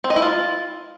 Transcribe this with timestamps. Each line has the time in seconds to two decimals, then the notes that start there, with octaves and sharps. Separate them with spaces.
0.04 C4
0.10 D#5
0.16 E4
0.22 F4